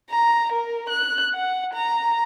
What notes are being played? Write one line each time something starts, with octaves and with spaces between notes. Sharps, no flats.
A#5
A#4
F#6
F#5
A#5